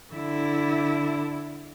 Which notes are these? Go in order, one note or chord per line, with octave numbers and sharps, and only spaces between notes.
D3 E4